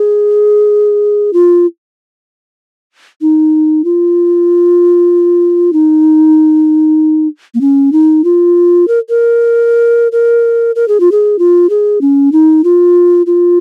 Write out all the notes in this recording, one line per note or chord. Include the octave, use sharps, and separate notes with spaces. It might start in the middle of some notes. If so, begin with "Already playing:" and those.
Already playing: G#4
F4
D#4
F4
D#4
A#3
C#4
D#4
F4
A#4
A#4
A#4
A#4
G#4
F4
G#4
F4
G#4
C#4
D#4
F4
F4